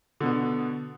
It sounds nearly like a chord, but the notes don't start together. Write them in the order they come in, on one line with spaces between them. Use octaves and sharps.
D3 B2 B3